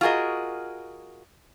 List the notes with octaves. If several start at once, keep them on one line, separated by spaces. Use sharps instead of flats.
F4 F#4 G#4 A#4 D#5